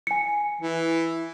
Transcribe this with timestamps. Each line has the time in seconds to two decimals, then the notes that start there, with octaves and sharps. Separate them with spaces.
0.07 G#5 C#7
0.61 E3